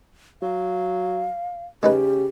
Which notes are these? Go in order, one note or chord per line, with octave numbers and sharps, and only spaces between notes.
F#3 F5
C#3 G#3 D#4 G4 B4